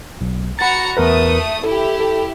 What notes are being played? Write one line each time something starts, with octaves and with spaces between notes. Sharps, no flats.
B1
F#4 A#5 B5 A6 C#7
E2 A3 A#4 B4 D#6
E4 G4 A4
A4